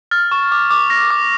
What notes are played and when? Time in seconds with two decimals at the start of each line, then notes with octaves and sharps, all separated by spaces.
0.11 F6 A6
0.32 C#6
0.52 D6
0.71 D6
0.90 F6 A#6
1.11 D6